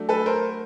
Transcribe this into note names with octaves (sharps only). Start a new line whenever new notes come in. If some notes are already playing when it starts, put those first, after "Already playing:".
Already playing: F#3 A3 D4
A4 B4
A#4 C5